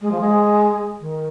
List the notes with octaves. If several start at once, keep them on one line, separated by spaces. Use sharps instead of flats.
G#3
F3
G#3
D#3